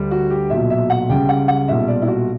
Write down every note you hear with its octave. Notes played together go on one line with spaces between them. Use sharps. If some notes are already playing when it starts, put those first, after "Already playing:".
Already playing: D2 D3 G3
F#4
G4
B1 A#2 F#3 E5
E5
F#5
C#2 C#3 G3 G5
F#5
F#5
B1 A#2 G3 E5
D5
E4
F#4